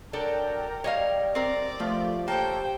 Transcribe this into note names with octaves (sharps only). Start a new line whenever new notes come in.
F#3 D4 A4 A#4 G5
G3 C#5 D#5 F5
C4 A#4 D5
F3 A3 F4 G4
A#3 G4 A4 C5 C#5 G5 A5